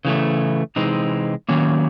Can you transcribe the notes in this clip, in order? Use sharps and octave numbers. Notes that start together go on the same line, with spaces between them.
C#3 E3 A3
C3 E3 G#3 C4 D#4
D#3 F#3 A#3 C#4